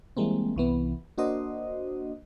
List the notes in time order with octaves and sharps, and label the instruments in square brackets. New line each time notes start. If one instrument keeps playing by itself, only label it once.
[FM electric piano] E3 G3 G#3 A#3 C4
C2 E3 B3
A#3 D4 F#4 C5 D#5